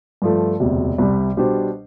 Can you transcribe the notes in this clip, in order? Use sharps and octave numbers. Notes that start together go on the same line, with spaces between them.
G2 F3 A3
E1 D2 C3
C2 C3 G3
B2 G3 D4 G4 C5